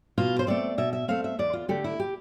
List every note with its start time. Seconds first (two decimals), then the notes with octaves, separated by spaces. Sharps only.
0.18 B2 F4
0.39 C5
0.47 A3 C4 D5
0.78 B2 E5
0.93 E5
1.08 A3 C4 F5
1.24 E5
1.39 E2 D5
1.53 F4
1.68 D3 A3 G4
1.84 E4
1.99 G4